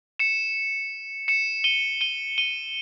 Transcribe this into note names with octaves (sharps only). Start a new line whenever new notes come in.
C#7 E7
C#7 E7
D#7 G7
D#7 G7
D#7 G7